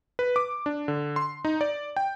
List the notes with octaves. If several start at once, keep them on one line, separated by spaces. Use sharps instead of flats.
B4
D6
D4
D3
C6
D#4
D5
G5